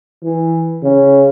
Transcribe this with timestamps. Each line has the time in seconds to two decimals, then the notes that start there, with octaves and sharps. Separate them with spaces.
0.23 E3
0.83 C#3